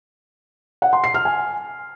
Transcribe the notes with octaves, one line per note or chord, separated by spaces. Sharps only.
F#5
C6
C7
F6
G#5